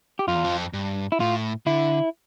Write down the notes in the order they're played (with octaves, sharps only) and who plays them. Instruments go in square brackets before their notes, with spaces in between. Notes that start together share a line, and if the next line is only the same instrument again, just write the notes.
[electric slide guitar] G4
[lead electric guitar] F2 [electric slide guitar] F4
[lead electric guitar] E2
F2
G2
[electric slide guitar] E4
[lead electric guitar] A2 [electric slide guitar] F4
[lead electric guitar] D3 [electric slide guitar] E4